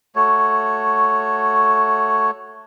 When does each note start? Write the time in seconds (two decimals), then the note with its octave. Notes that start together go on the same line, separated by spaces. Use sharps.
0.16 A3 F#4 C#5